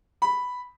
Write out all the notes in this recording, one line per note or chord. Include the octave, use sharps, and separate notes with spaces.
B5